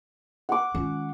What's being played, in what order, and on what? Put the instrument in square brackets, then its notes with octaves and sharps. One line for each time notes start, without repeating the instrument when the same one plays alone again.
[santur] F#5 D6
[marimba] D#3 G#3 C#4 [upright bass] F4